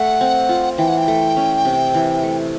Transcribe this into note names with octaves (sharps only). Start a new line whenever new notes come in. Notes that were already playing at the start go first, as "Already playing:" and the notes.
Already playing: A3 F#5
C4
F4
E3 G5
F#5
G5
A3
C#4
C3
E3
A3